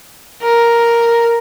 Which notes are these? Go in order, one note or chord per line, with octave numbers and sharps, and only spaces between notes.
A#4